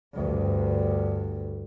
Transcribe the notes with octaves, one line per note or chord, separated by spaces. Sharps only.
D2 G2